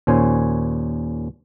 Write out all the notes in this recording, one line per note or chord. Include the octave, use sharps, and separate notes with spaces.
D#2 A#2 C#4 C5 C#5 G#5